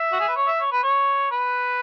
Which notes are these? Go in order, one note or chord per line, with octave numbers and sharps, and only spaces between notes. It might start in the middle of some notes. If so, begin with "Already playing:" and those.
Already playing: E5
F#4
G#4
B4
C#5
E5
C#5
B4
C#5
B4